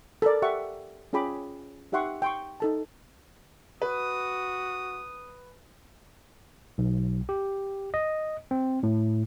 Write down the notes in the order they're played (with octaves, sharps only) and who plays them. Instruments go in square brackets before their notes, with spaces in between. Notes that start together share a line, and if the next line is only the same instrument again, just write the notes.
[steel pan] A4 A#4 D5
G4 E5 F#5 C#6
C#4 F4 G#4 G5 B5 D6
D#4 G4 E5 F#5 C6 C#6
G5 C6 C#6
D#4 A4 A5
[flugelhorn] F#4 [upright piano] B4 [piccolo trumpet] D#6
[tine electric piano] B1
G4
D#5
C4
A2